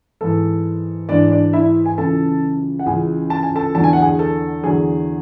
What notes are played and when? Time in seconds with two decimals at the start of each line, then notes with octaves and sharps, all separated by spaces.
0.21 G#2 E3 A4
1.09 G#2 E3 D4 D5
1.31 D4 D5
1.53 E4 E5
1.86 G#5
1.98 C#2 C#3 E3 A4 A5
2.79 F#5
2.86 C#2 C#3 E3 G#4 G#5
3.30 A5
3.43 G#5
3.55 A4 A5
3.75 E2 D3 F#3 A5
3.84 G#5
3.93 F#5
4.02 G#4 G#5
4.19 A4
4.63 E2 D3 F#3 G#4